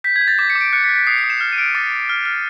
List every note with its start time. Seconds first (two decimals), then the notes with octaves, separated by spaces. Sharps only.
0.04 G6 B6
0.16 G#6
0.21 G6
0.28 A6
0.39 D6 B6
0.50 C#7
0.55 D6
0.61 D7
0.73 F#6 C#7
0.84 B6
0.89 F#6
0.95 B6
1.07 D#6 C7
1.18 C#7
1.24 D#6
1.30 E7
1.41 F6
1.52 D#7
1.58 F6 D7
1.75 D6 A6
1.92 D6
2.09 F6
2.26 F6